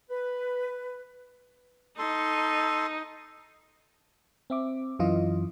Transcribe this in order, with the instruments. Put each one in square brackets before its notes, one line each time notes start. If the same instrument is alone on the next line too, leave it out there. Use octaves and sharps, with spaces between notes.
[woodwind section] B4
[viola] D#4 [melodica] A4 C6
[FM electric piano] C4 E5 D6
F#2 E3 F4 D#5